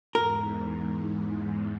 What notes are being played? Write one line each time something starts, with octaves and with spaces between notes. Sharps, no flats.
E2 G#2 A#4